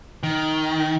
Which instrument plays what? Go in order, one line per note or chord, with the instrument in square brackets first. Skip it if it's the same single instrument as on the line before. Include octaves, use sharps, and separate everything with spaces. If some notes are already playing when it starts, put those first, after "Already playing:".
[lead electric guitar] D#3